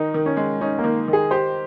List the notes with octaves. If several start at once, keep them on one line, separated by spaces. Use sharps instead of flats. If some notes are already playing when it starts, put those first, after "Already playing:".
Already playing: D#3 D#4
D#3
C#4
G#3
C#4 D#4
A#3
D#3
D#3
G#4
G4 C5